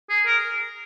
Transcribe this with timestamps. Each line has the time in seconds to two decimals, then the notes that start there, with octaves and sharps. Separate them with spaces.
0.09 G#4
0.26 A#4